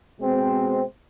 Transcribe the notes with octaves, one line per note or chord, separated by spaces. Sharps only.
B2 G#3 C4